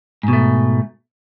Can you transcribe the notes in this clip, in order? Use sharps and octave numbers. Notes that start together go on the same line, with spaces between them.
G#2 B2 A3